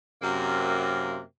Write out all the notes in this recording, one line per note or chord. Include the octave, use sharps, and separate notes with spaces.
F#2 C3 A#3